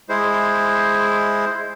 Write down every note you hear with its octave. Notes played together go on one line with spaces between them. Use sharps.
G#3 E4 C5